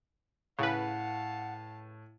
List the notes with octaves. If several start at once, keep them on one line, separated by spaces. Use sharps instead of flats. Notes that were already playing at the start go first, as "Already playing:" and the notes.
A2 C#3 B4 F5 F#5 A5